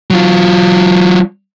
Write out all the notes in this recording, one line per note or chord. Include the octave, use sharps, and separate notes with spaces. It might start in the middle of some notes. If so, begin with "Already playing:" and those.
F#3 F4